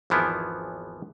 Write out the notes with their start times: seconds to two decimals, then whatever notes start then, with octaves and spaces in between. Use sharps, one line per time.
0.10 G#1 E2 E3 F3 B3 E4